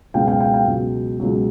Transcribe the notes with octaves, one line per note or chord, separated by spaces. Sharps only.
C#2 B2 F#3 F5 G5
F5 G5
F5 G5
F5 G5
C#2 B2 F#3
C#2 B2 F#3